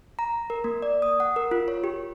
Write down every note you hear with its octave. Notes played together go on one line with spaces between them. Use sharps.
A#5
A#4
A#3
D5
D#6
F#5
A#4
F4
C#5
G4